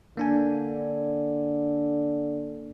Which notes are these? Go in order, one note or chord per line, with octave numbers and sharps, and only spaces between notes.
D3 A#3 D4 G#5